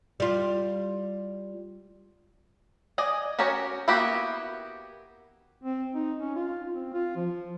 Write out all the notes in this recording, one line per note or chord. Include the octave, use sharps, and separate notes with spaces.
G3 F4
D5 D#5 G#5
C#4 F#4 G4 A#4 C#5
A#3 B3 E4 F#4 G4
C4
D#4
C#4
F4
C4
F4
F3